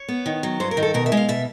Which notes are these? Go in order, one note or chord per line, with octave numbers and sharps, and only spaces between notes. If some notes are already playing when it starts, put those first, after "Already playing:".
Already playing: C#5
B3
D#3
F#3
G2 C5
A#4
D#3
A4
B2 A#4
E5
G#3
F5
B2 E5